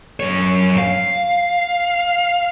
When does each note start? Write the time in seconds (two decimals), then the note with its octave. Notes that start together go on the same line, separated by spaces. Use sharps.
0.20 F#2 C#5
0.78 F5